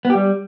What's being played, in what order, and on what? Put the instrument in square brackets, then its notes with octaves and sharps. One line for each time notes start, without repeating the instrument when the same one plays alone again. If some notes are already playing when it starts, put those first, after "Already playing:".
[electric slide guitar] B3
G4
G3